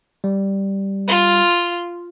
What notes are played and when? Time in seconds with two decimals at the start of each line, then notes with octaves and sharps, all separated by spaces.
0.24 G3
1.08 F4